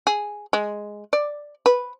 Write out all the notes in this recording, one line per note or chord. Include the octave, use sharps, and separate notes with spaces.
G#4
G#3
D5
B4